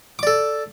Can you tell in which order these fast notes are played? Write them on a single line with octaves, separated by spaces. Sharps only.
D6 D5 A4